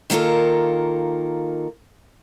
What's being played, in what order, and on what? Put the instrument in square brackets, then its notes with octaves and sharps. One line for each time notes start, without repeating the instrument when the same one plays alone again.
[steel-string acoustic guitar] D#3 A#3 F4 A4 A#4